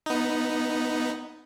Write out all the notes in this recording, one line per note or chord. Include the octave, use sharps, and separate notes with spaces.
B3 D#4